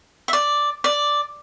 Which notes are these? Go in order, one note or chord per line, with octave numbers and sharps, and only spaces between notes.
E5
D5
D5